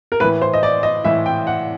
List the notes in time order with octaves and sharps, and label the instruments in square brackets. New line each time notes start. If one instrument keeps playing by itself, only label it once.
[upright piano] A#4
A2 E3 B4
C5
D#5
D5
D#5
A2 E3 E5
G5
F#5